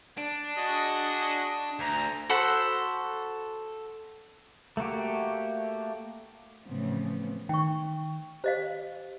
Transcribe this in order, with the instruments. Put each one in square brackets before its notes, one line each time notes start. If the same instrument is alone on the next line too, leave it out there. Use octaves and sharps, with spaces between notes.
[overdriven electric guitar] D4
[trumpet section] F#4 G#4 D#5
[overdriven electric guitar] D2 [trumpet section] A#5
[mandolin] F#4 A4 C5 B5
[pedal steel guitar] A3 A#3 F#4 G4
[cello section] A2 C#3 E3 F3 B3 C4
[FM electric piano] D#3 [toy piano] G5 C#6
[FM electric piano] G4 [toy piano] C5 D#5 F5